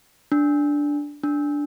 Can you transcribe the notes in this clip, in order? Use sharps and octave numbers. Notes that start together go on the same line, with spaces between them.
D4
D4